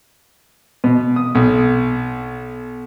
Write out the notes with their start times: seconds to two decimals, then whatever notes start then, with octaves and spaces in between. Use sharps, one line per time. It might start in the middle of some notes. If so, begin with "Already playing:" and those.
0.84 B2
1.16 D#6
1.35 B1